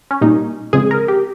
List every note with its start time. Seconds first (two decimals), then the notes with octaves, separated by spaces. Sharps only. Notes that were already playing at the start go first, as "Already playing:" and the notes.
0.11 C#4
0.21 A#2 G3 A#3 D#4
0.73 C#3 F3 G#3 C4 G#4
0.91 A#4
1.08 G4